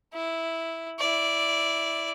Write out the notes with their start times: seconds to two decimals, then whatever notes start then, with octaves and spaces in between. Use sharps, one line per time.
0.13 E4
0.99 E4 D5